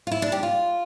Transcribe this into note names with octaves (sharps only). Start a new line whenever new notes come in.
F4
E4
D4
G4
F4